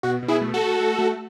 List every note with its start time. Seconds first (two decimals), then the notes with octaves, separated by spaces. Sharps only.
0.03 B2 F#4
0.23 B2
0.28 E4 G#4
0.42 A3
0.54 F#4 A4
0.61 A3
0.80 A3
0.99 A3